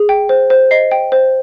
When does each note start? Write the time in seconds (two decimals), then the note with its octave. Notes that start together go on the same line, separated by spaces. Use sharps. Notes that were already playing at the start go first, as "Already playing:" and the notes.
Already playing: G#4
0.09 G5
0.29 C5
0.50 C5
0.71 D#5 C7
0.91 G5
1.12 C5